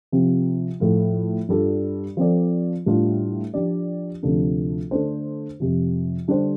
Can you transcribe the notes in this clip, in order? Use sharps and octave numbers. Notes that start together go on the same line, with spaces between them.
C3 F3 C4
A2 F3 A3 F4
G2 G3 F4 A4
F3 C4 A4 D5
A2 G3 D4 F4
F3 D4 G4 D5
D2 C3 F3 D4 A4
D3 A3 D4 A4 C5
F2 C3 F3
D3 G3 D4 G4 C5